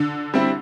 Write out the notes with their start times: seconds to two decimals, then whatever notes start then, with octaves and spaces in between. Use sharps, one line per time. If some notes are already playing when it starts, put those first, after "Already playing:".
Already playing: D3
0.34 G3 C4 E4